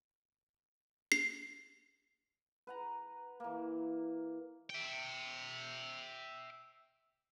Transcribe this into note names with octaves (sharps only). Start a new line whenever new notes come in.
C7
B4 F#5 A#5
E3 A#3
E5 G5